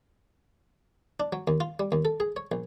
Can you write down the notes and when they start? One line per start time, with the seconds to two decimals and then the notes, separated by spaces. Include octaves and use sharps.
1.20 D4
1.32 F#3
1.47 D#2
1.60 F4
1.79 G3
1.92 D#2
2.05 A4
2.20 G#4
2.36 C#5
2.52 A#1